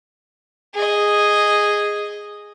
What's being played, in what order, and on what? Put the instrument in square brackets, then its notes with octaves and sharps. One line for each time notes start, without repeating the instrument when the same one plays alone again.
[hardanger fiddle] G#4 D#5